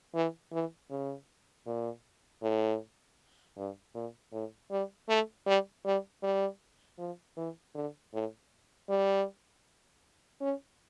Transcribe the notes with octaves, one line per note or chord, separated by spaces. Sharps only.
E3
E3
C#3
A#2
A2
G2
A#2
A2
G3
A3
G3
G3
G3
F3
E3
D3
A2
G3
C#4